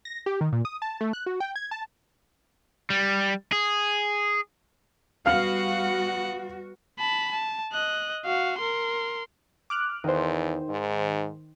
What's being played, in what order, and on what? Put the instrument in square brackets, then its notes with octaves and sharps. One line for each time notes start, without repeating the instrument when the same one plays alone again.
[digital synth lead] A#6
G4
D#3
A#2
D#6
A5
A3
F#6
F#4
G5
G#6
A5
[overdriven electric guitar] G3
G#4
[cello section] G3 F#4 [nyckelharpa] B3 F#5 [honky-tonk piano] F5 F6
[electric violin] A5 B5
A5
D#5 F#6
F#4 F5
A#4 C6
[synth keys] D6 F6 F#6
[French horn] E2 [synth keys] D#3 C5
[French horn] G#2